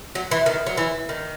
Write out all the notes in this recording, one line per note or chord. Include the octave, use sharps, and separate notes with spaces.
F#3
E3
D#3
F#3
E3
D#3